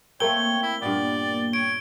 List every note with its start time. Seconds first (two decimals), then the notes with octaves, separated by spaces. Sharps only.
0.20 A3 A#3 C4 A4 C#5 G5 G7
0.63 E4
0.82 G2 A#2 B3 D5
1.53 C#5 D7